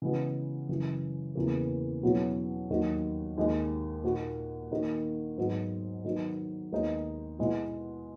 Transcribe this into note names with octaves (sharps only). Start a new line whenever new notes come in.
C#3 E3 G#3 B3 F#4
F#2 C#3 E3
E2 C#3 E3 A#3
E2 B2 F#3 C#4 E4
D#2 D#3 F#3
D#2 D#3 G#3
A#2 A#3 D#4 F#4
D#3 A#3 D#4 F#4
G#2 F#3 B3
D#3 F#3 B3 D#4
D#2 D#3 G#3 B3 D#4
B2 G#3 B3 E4